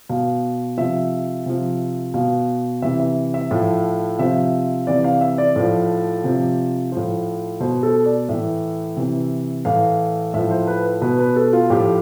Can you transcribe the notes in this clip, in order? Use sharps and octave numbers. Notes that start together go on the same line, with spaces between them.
B2 F5
C3 F3 E5
C3 F3
B2 F5
C3 E3 E5
E5
E5
A2 F3
C3 F3 E5
C3 E3 D5
F5
E5
D5
A2 F3
C3 F3
A2 F3 C5
B2 C5
A4
D5
A2 E3 E5
C3 E3
A2 E3 F5
A2 F3 E5
C5
B4
B2 B4
B4
A4
F4
A2 F3 G4